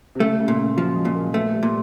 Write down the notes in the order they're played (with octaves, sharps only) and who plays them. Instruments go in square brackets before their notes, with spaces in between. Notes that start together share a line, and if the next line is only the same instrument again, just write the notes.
[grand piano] C3
[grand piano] C#3 [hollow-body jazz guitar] A3
[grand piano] C#3
[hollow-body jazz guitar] A#2
[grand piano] C#3
[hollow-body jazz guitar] F3 [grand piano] F#3
[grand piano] G#3
[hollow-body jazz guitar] A#2
[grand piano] A#3
[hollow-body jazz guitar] A3 [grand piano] B3
[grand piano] G3
[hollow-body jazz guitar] A#2